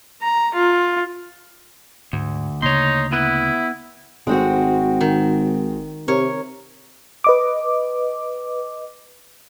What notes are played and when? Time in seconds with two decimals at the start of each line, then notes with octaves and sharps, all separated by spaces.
0.22 A#5
0.54 F4
2.13 D2 G#2
2.62 D2 C#3 A#3 D#4 C#5 C6
3.12 B3 E4 B4
4.27 G#1 G#3 C4 F#4
5.01 D#3
6.08 C3 A#4 C#5
7.24 B4 D#5 D6